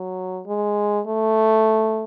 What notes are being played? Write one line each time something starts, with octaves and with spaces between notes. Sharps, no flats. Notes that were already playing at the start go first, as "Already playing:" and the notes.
Already playing: F#3
G#3
A3